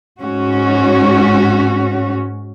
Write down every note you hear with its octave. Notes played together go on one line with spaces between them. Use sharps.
G#2 C#4 F#4